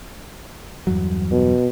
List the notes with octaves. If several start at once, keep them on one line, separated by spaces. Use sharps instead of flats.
E2 G2 F#3
B2